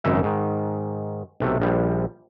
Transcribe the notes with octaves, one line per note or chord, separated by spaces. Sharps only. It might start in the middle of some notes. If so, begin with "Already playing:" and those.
G#1 F#2 C#3 D#4 E5
G#2 D#3
B1 C3 A3
A#1 F3 G3